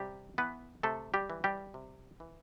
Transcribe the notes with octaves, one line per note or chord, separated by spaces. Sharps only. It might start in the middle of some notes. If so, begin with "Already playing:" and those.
Already playing: C3 G3 G4
E3 B3 B4
C3 A3 A4
G3 G4
E3
G3 G4
C3
E3